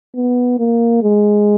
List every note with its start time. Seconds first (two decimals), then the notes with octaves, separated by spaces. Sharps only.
0.16 B3
0.59 A#3
1.03 G#3